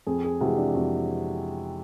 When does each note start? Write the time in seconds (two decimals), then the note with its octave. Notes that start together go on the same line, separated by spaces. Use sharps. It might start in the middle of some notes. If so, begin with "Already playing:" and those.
0.07 F2 G#4
0.24 G#4
0.40 C3 E3 G#3 F#4
0.58 D4
0.74 F2 F#4